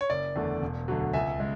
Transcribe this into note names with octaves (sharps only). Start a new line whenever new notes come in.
C#5
F#1 D5
E2 D3 A3
E1
D2 D3 F#3
C#2 E5 G#5
C#3 G#3